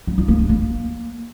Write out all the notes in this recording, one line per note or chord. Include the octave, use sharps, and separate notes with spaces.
F#3
F4
A#3
D4
A#3